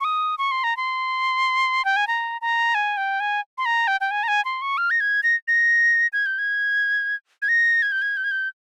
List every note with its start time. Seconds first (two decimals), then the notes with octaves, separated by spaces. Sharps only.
0.01 C#6
0.04 D#6
0.38 C#6
0.51 C6
0.64 A#5
0.77 C6
1.85 G5
1.96 G#5
2.07 A#5
2.41 A#5
2.75 G#5
2.97 G5
3.20 G#5
3.58 C6
3.65 A#5
3.87 G5
4.01 G5
4.11 G#5
4.23 A#5
4.28 G#5
4.45 C6
4.62 C#6
4.78 F6
4.91 A#6
5.00 G#6
5.23 A#6
5.48 A#6
6.13 G#6
6.26 G6
6.39 G#6
7.42 G#6
7.49 A#6
7.82 G#6
7.92 G6
8.02 G#6
8.17 G6
8.24 G#6
8.31 G6